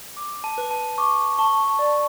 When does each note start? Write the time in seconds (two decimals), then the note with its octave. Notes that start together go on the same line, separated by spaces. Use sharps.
0.17 D6
0.44 A5
0.58 B4
0.71 A5
0.98 C#6 D6
1.38 A5 C#6
1.79 D5